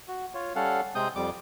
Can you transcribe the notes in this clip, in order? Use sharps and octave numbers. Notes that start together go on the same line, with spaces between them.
F#4
F4 C#5
G3 C#4 A4 F5 F#5
C3 G#3 C4 D#6 G6
F2 G3 D6